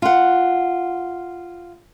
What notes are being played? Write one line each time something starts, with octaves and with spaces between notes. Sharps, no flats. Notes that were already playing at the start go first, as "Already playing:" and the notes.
F4 F#5